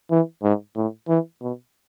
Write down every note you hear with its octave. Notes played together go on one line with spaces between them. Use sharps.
E3
G#2
A2
E3
B2